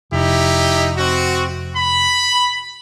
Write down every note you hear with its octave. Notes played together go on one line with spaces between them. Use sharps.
F1 D#4 E4 G4
C4 F#4
B5